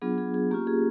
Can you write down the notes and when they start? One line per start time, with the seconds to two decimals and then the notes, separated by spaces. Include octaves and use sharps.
0.02 F#3 B3 D4 F4 G#4
0.18 G#4
0.34 G#4
0.51 A#3 C#4 F4 G4
0.67 G#4